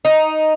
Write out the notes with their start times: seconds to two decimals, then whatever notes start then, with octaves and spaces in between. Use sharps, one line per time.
0.05 D#4